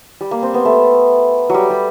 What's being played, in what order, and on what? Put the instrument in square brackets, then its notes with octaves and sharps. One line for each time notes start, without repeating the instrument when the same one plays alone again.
[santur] G3
A#3
C4
B3
A3
F#3 G3
G3